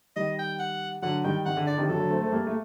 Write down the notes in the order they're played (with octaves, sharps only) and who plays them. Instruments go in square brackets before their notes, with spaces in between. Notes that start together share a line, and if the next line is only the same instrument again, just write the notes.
[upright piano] D#3 G3 [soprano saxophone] D#5
[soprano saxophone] G5
F#5
[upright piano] D3 F#3 [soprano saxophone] F#5
[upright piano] D#3 G3 [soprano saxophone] G5
[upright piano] C3 D#3 [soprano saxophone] F#5
[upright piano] D3
[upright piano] D3 [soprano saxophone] D5
[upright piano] C3 D#3
[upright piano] D3 F#3 [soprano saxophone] A4
[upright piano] D3 F#3
A3 C4
A3 C4
G3 A#3
A3